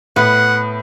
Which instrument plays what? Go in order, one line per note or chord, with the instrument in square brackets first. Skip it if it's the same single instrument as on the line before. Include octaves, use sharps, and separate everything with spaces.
[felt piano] A2 [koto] B3 [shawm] F#5